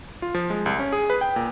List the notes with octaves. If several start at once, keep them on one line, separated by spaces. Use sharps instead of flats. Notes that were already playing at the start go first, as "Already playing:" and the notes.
F4
F3
G#3
C2
C#4
G#4
B4
G5
A#2